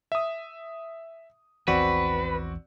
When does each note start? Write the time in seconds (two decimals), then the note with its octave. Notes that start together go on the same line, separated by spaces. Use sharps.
0.12 E5 D#6
1.68 A#1 E2 E3 C4 F#4 B4 D5